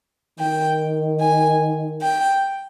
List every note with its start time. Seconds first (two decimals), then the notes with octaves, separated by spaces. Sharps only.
0.38 D#3 G5
1.20 G#5
2.01 G5